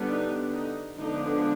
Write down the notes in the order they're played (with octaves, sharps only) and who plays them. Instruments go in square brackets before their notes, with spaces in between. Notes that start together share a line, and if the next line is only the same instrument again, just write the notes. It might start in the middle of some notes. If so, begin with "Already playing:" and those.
Already playing: [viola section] D3 G3 B3 D4
D#4
D#4
D3 F3 G#3 B3 D4 D#4